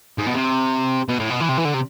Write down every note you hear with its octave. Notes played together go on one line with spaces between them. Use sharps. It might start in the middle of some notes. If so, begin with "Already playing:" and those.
G#2
B2
C3
B2
A2
B2
E3
C3
E3
D3
C3